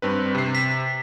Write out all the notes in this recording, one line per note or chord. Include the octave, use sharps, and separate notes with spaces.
G2 C4 B4
C3 C7
B6